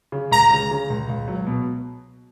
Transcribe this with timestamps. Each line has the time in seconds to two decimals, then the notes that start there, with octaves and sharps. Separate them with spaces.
0.12 C#3
0.31 C#2 A#5
0.51 C#3
0.71 C#3
0.90 C#2
1.10 C#2
1.28 F#3
1.47 B2